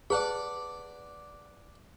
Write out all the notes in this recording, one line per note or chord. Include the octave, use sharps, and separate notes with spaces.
G#4 B4 D5 F#5 A5 B5